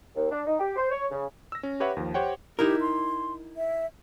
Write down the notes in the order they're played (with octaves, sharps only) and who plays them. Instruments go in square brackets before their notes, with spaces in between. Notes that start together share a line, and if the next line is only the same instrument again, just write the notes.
[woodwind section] D#2
D4
D#4
G4
C5
C#5
C#3
[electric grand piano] E6 A#6
C#4
G4 B4 C#5 E5 F#5
D#2 F3
G4 C5 C#5 F#5 G5
[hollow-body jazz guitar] D#4 E4 A#4 [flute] G4
[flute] C6
E5